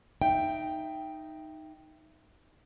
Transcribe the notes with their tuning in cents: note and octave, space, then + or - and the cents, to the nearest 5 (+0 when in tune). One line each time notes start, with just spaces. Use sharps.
D#4 +0 E5 +20 G5 +0